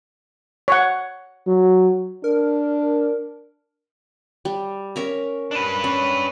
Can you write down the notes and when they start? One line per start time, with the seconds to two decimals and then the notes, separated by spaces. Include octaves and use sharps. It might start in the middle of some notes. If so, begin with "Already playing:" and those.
0.68 C#5 F#5
1.47 F#3
2.24 D4 A#4
4.45 G3
4.96 C#4 A#4 E5
5.51 D4 B4
5.84 C#4